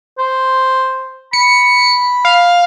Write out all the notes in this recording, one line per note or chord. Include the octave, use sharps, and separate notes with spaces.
C5
B5 C#7
F5